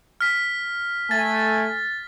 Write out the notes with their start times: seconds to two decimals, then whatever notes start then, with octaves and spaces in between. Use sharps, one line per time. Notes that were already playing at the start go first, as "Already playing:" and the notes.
0.21 F6 B6
1.11 A3 G#5 A6